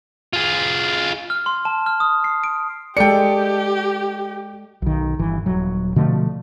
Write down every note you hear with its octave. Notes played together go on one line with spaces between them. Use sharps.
F4 G#4
F6
C6
A5
F6
D#6
C7
D7
G#3 G4 A4 D5 G5 C#7
B1 D#3
G1 E3
D#1 F#3
B2 D3 F3 A3